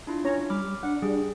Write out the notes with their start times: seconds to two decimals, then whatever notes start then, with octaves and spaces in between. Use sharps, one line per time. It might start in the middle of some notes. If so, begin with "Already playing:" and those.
0.07 D4 E4 F4
0.24 C#4 C#5 A#5
0.50 G3 B5 D6 F6
0.83 D4 F#5
1.02 G3 G#4